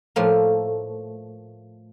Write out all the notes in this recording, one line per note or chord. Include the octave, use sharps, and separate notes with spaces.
A2 F3 A3 A#3